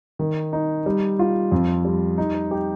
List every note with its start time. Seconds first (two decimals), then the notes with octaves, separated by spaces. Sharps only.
0.19 D#3
0.53 D#4
0.86 G3
1.19 F4
1.52 F2
1.85 G3
2.18 D#4
2.51 G4